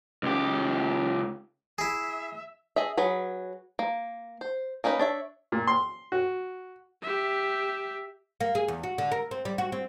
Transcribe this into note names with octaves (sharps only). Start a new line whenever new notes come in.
C#2 G4
E4 G#4 E5
G#4 D#5 E5
F#3 G#4 B4
A#3
C5
A#3 C#4 D#4 B4
D4 C#5 E5
A#2
C6
F#4
G4 E5
A#3
G#4
E2
F#4
D3
A#4
C4
G3
F#4
C4